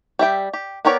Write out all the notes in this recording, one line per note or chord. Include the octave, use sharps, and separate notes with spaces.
G3 E5 G5
G4
B3 G4 A#4 C#5 D5